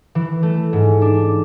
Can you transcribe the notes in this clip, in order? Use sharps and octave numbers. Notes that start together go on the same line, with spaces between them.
E3
A3
G#2
D4